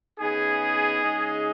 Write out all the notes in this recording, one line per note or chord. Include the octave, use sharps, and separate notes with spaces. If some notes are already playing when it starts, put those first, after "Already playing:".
C#3 B3 D#4 G#4
C#3 G#3 D#4